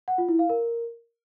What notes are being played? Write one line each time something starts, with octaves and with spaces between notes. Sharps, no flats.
F#5
F4
E4
F5
A#4